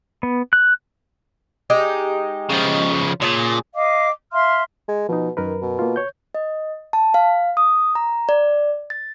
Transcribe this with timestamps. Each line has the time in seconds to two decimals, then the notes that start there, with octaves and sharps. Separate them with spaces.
0.23 B3
0.53 F#6
1.70 G#3 D#4 G4
2.50 C#3 F3
3.22 A#2 C#3 A5
3.74 D#5 F5 D6
4.31 E5 F5 C6 F6
4.89 G#3
5.09 B2 F3 D#4
5.37 F#2 D#3 A#4 B4
5.62 B2
5.79 A#3 F4
5.96 C#5 G6
6.35 D#5
6.93 A5
7.14 F5
7.57 D#6
7.95 A#5
8.29 D5
8.90 A6